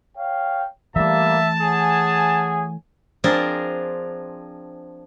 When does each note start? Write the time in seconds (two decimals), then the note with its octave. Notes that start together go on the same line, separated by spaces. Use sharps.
0.17 C#5 F5 G5
0.96 E3 G3 A3 A#3 E5 A5
1.61 G#4 C#5 F#5 G#5
3.24 F3 C4 D4 G#4 A#4 C5